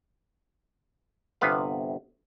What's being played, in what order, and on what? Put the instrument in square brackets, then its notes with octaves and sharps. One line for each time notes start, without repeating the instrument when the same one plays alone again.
[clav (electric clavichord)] G1 C3 B3 B4 F5